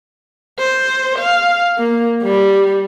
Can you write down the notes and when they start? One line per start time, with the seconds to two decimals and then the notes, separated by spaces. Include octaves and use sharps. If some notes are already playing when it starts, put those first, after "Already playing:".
0.59 C5
1.19 F5
1.78 A#3
2.22 G3